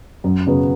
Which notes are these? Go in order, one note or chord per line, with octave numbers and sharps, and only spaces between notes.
F#2
C#3 F#3 B3